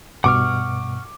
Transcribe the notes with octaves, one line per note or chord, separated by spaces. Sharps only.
G2 B2 F#5 C#6 D6 F6